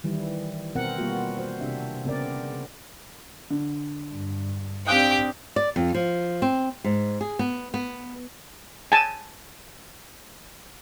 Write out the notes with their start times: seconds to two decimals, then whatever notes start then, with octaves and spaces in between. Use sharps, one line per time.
0.04 D#3 E3 G3 E4
0.75 B2 B3 C4 A#4 F#5
0.98 G3 A#3 B3 F4 F#4
1.38 F#4 C5
1.61 C3 C4 D4 E5
2.05 C#3 B3 C4 A#4 D5
3.50 D3
4.11 G2
4.86 C4 D4 G4 F5 G5 D#6 F#6
5.56 D5
5.76 F2
5.94 F3
6.42 C4
6.84 G#2
7.21 G#4
7.39 B3
7.74 B3
8.92 G#5 A5